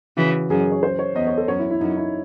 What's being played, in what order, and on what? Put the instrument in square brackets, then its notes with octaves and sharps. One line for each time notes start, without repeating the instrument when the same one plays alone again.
[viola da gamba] C#3 E3 [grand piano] F#4
[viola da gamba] F#2 [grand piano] G#4
[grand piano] C#5
C#5
C5
C#5
[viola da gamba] E2 [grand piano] D#5
[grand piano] C#5
A4
[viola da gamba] F#2 [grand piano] C#5
[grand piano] E4
E4
[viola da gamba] F#2 [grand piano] D#4
[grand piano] E4